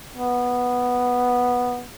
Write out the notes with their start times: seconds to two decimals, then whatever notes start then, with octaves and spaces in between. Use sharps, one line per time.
0.17 B3